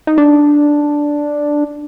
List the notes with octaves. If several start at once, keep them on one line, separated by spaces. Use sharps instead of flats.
D#4
D4